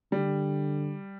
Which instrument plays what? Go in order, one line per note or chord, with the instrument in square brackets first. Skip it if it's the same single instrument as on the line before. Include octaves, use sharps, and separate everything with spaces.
[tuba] D3 [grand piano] G3